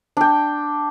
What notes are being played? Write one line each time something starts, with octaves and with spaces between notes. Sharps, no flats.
D4 G5